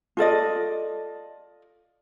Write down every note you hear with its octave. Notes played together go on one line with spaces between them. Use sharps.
F4 A4 D5 D#5